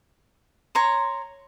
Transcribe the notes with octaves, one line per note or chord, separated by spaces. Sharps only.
C#5 A#5 C6